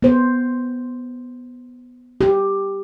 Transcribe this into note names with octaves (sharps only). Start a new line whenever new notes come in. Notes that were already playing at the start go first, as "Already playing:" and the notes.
B3 C5
G4